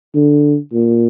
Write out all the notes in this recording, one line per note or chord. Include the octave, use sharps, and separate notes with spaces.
D3
A#2